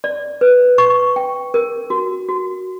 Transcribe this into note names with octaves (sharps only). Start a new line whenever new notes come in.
D5
B4
C#6
G5
A#4
F#4
F#4